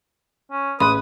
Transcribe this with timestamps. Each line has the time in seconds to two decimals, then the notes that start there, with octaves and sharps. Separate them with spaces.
0.51 C#4
0.80 A1 G#4 B4 B5 C6 D#6 F#6